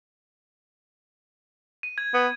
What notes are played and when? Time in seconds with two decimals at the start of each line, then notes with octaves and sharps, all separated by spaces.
1.83 D#7
1.98 G#6
2.14 B3